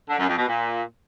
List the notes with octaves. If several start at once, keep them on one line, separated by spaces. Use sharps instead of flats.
D3
F#2
F2
B2
A#2